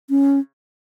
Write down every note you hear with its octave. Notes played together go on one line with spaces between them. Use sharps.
C#4